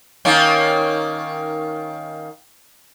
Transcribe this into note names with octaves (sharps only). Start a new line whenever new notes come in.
D#3 A#3 C#4